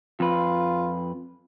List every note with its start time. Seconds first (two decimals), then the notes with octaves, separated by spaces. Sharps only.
0.20 F2 F4 B4